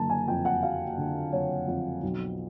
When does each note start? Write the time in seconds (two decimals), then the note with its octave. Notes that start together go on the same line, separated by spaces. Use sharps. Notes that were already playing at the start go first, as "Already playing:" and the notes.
Already playing: F#1 D3 F#3 A5 A#5
0.10 G#5
0.28 F2 G5
0.45 F#5
0.62 F#3 F5
0.98 D3
1.32 F#1 C#5
1.68 F2
2.03 B1